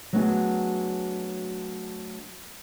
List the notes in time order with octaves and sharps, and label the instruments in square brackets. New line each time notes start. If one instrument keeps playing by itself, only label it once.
[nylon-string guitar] F#3 A3 B3 D4 F#4 G#4